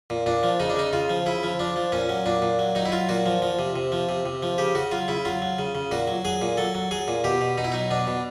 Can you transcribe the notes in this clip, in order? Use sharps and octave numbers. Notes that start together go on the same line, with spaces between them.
A#2
A#2 D4
F3
C#3 D#4
D4
C#3 D#4
C#3 F4
F3
C#3 E4
F3
F3 D4
F3
A#2 C#4
F#3
A#2 D4
A#2
F#3
F#3 D#4
E4
F#3 F4
A#2 F#4
F3
F3
C3
C3
F3
C3
C3
F3
C#3 G4
C#3 F#4
F#3 F4
C#3 E4
F#3 F4
F#3
C#3
C#3
A#2 F#4
F#3
F#3 G#4
A#2
F#3 A4
F#3
F#3 G#4
A#2
B2 G4
B2
B2 D#4
E4
F#3 D#4
B2 D4
B2